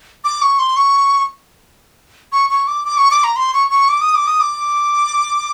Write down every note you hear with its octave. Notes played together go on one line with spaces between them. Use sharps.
D6
C#6
C6
C#6
C#6
C#6
D6
D6
C#6
D6
A#5
C6
C#6
C#6
D6
D#6
D6
D#6
D6